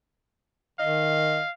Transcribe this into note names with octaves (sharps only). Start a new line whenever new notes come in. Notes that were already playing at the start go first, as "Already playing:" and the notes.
D#3 D#5 F5